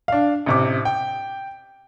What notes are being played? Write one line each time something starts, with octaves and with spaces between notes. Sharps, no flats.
D4 F5
A1 C3 D6
G5